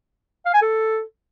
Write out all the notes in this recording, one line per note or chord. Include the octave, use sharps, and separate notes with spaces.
F5
G#5
A4